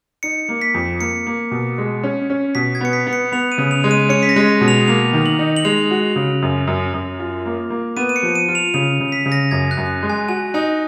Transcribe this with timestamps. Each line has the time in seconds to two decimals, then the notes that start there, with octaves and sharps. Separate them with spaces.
0.23 D#4 C#7
0.49 A#3
0.61 B6
0.74 F2
1.00 A#3 C#7
1.27 A#3
1.51 B2
1.78 G#3
2.03 C#4
2.30 C#4
2.55 B2 B6
2.75 G#6
2.81 B3 C#7
2.93 B6
3.07 B3
3.13 C#7
3.32 B3 F7
3.52 D#7
3.58 C#3
3.71 F7
3.84 G#3
3.91 D#7
4.09 C#4 C#7
4.23 B6
4.29 A#6
4.36 G#3
4.48 A#6
4.61 B2
4.68 F7
4.87 A#3 F7
5.13 D#3
5.26 F#7
5.39 D#4
5.56 F#7
5.65 G#3 F7
5.91 F#4
6.16 C#3
6.42 F#2
6.67 F#2
6.94 F#2
7.20 F4
7.46 A#3
7.70 A#3
7.96 B3 D#7
8.09 D#7
8.16 C#7
8.23 F3
8.35 D#7
8.48 F4
8.55 F7
8.74 C#3 F7
9.00 C#3
9.12 B6
9.26 C#3
9.32 A#6
9.51 F#2 G#6
9.71 F#6
9.77 F#2
10.03 G#3
10.10 G#5
10.28 F#4 G#5
10.54 D#4 G#5